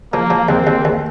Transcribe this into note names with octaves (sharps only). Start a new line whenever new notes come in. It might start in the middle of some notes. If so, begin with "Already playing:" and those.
F3 A#3
F3
D#2 C4
D#2
D#2